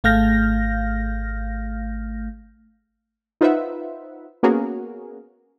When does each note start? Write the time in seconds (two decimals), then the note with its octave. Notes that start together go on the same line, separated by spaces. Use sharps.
0.04 G#1 A3 F5 F6 G6 A#6
3.41 D#4 F4 B4 C5 E5 F#5
4.43 A#3 B3 C#4 F#4 G#4 A#4